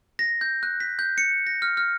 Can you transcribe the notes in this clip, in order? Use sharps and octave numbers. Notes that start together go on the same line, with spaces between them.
A#6
G6
F#6
B6
G6
C#7
A#6
F6
F6